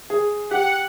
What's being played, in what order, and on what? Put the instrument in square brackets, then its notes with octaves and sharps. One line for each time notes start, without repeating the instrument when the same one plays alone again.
[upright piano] G#4
[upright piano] G4 [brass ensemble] F#5